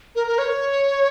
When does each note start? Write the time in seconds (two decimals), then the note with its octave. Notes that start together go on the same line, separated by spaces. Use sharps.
0.15 A#4
0.27 A#4
0.38 C#5